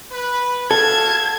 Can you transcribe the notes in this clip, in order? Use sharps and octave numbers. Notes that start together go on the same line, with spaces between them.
B4
F#4 A4 F5 A5 G#6